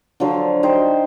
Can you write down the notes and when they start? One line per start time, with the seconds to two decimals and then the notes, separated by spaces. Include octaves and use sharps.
0.20 D3 F3 F#3 C5
0.63 D#4 C5 G5